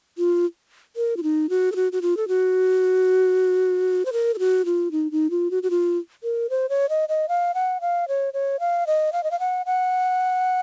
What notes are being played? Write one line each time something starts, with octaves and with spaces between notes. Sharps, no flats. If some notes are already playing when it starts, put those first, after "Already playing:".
F4
A#4
F4
D#4
F#4
A4
F#4
F#4
F4
A4
F#4
C5
A#4
A4
F#4
F4
D#4
D#4
F4
F#4
F#4
F4
A#4
C5
C#5
D#5
D#5
F5
F#5
F5
C#5
C#5
F5
D#5
F5
D#5
F5
F#5
F#5